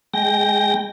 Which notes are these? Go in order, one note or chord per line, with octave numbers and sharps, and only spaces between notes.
G#3 G5 A#6